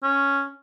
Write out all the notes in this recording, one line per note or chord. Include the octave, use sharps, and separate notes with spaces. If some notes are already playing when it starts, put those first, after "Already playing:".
C#4